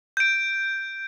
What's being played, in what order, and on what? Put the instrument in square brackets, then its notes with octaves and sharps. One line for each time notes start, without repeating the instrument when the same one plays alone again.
[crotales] G6 D7